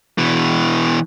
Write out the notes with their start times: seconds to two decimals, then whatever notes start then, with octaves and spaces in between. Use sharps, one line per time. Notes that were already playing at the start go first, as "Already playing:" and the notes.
0.18 B2 E3